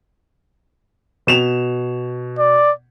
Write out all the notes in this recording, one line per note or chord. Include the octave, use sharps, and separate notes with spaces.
B2 E7 F7
D5